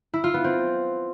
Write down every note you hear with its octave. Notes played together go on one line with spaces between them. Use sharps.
E4
F4
B3
C4